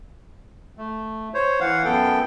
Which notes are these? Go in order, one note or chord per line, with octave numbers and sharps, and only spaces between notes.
A3
C5 C#5
E3 F5 F#5
F#2 B3 A4 G5